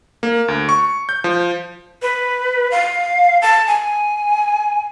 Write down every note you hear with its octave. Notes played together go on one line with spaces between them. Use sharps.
A#3
D2
C#6
G6
F3
B4
F5
A5
G#5